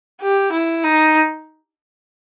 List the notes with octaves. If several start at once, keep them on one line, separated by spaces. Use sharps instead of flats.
G4
E4
D#4